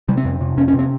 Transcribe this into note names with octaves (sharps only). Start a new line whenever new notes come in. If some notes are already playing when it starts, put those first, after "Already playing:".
C3 G3
C4
F2
C3
F2 C#4
C#4
C3 C4